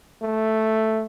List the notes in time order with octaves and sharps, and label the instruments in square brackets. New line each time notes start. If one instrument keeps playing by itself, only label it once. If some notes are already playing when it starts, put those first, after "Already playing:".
[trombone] A3